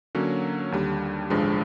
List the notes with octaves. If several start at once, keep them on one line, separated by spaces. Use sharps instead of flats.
D3 F#3 A#3 C#4
D#2 D3 G3
A1 G2 D3 F3 G#3